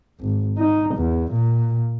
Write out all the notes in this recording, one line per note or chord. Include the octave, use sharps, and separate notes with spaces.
G#1
D#4
E2
A#2